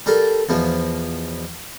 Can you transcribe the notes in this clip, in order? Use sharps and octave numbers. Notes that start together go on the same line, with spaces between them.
G3 A4 A#4
E2 B2 F3